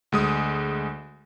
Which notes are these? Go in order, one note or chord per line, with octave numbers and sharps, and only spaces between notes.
D2 G#3 D#6